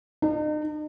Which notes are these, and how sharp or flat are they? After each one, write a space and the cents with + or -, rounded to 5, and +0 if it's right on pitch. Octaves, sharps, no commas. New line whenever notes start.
D#4 -40